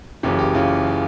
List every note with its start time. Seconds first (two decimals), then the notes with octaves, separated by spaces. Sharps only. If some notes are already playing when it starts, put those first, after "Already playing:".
0.23 F#1 F#2 C#3 E3 G4
0.39 G4
0.54 C#3 E3 F4